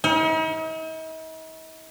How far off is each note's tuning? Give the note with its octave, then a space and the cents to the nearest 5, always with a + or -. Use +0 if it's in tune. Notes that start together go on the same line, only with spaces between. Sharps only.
D#4 +45